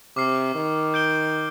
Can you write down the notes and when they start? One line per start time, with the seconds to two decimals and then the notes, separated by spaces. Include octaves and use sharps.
0.16 C3 D6 F6 C7
0.55 D#3
0.94 G6 D7 G7